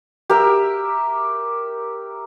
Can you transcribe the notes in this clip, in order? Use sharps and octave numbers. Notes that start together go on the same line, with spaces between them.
G4 A#4 E5